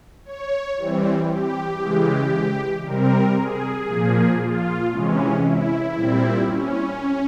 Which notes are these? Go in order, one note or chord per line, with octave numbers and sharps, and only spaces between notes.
C#5
E3 G3 C4
G4
C#3 E3 G#3
C3 G3 C4 A#4
G#4
A#2 F3 A#3
F4
C3 E3 G#3 C#4
E4
A#2 G3 C4
C#4